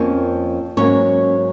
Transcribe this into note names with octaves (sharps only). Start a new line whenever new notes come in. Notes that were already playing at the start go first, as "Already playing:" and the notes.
Already playing: F2 F3 A#3 C#4
G#2 F#3 A#3 C#4 C#5